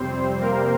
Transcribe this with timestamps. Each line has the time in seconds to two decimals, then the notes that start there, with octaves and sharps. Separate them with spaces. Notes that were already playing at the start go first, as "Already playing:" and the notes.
Already playing: F2 C3 G3 C4 C5
0.40 A#3 A#4